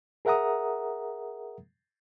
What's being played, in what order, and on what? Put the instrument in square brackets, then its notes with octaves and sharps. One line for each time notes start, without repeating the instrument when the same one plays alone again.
[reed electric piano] G#4 A#4 E5 F#5 A#5 D#6